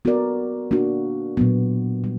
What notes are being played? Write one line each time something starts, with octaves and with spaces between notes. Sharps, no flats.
B3 F#4 A#4 D5
A#3 D4 F#4
A#2 F#3 B3
G3